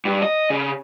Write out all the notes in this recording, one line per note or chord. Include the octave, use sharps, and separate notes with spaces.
G2
D#5
C#3